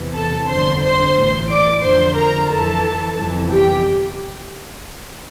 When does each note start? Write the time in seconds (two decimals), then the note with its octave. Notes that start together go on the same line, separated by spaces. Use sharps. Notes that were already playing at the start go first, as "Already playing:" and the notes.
Already playing: E2 C3 E3
0.14 A4 A5
0.48 G1 F2 D3 C5 C6
0.81 C5 C6
1.15 A1 A2 E3
1.49 D5 D6
1.83 F2 D3 F3 C5 C6
2.16 A#4 A#5
2.50 F2 E3 A4 A5
3.17 G1 F2 C3 E3
3.51 G4 G5